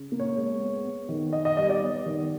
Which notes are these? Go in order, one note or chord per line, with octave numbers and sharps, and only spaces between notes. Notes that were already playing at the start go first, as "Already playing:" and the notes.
Already playing: C#3
A#3
C#5
G#3
B3
B3
D#3
B3 D#5
D#5
G3 D#5
D5
B3
D#3